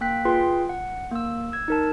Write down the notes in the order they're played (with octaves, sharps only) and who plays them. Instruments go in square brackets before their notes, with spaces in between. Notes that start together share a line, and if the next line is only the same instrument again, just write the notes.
[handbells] A#3 G5 F#6 B6
F4 G#4 B4 G5 C6
F#5
A#3 E6
E6 G#6
D#4 A#4 A5